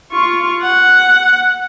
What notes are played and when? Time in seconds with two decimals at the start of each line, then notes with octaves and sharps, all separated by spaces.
0.12 F4 C#6
0.62 F#5